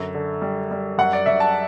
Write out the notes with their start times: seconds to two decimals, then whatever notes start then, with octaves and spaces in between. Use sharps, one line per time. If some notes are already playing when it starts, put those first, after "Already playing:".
Already playing: F#2 D3
0.15 D3
0.42 G3
0.71 G3
0.98 F#2 F#5
1.13 D5
1.26 F#2 E5
1.40 A5